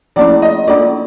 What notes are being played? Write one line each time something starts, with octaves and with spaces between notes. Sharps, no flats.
F3 A#3 C#4 E4 D5
D#5
A#3 D4 F4 D5